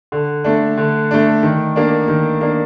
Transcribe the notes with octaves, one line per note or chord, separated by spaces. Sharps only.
D3
A3 D4
D3
A3 D4
D#3
A#3 D4
D#3
A#3 D4